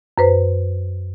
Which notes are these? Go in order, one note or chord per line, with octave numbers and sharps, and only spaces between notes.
F#2 B4 C5